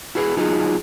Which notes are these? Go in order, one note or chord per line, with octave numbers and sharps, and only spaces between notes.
E4 F#4 G#4 B4
F#3 D#4 F4 F#4 G#4